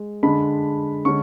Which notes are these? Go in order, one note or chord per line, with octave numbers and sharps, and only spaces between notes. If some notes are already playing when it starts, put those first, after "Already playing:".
Already playing: G#3
D3 G#3 D4 B5
D3 G#3 C#4 C#6